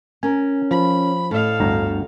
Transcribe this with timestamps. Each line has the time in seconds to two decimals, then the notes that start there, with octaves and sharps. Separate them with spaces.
0.23 C#4 A#4 G#5
0.71 F3 B5
1.31 A2 A4 D#5 F5
1.60 G1 D2 A#5